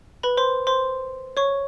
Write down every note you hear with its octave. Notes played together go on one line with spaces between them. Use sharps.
B4 B5
C5 C6
C5 C6
C#5 C#6